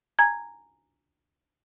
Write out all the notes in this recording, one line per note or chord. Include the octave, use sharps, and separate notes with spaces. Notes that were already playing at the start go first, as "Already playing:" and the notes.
G#5 A#5 G#6